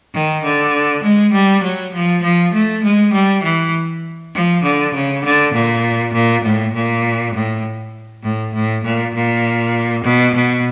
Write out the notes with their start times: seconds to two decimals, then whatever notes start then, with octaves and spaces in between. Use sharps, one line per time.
0.14 D#3
0.43 D3
1.03 G#3
1.33 G3
1.63 F#3
1.94 F3
2.23 F3
2.53 A3
2.83 G#3
3.13 G3
3.43 E3
4.34 F3
4.63 D3
4.94 C#3
5.24 D3
5.54 A#2
6.14 A#2
6.44 A2
6.74 A#2
7.34 A2
8.24 A2
8.54 A2
8.84 A#2
9.14 A#2
10.04 B2
10.35 B2